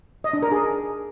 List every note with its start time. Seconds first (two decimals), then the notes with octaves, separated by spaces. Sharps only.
0.24 D#5
0.33 D4
0.43 A#4
0.52 G#4